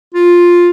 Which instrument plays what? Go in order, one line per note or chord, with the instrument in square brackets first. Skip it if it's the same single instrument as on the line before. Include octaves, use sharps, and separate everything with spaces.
[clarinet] F4